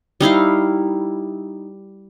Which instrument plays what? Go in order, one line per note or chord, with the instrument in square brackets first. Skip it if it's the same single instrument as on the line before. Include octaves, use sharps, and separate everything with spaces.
[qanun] G3 D#4 E4 F5